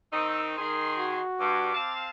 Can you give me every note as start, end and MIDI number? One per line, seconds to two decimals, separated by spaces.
0.12 0.55 51
0.12 0.55 60
0.12 0.55 63
0.12 0.44 88
0.57 1.20 51
0.57 1.20 68
0.57 1.22 84
0.98 1.78 66
1.39 1.73 43
1.39 1.93 86
1.74 2.09 60
1.74 2.09 77
1.74 2.09 81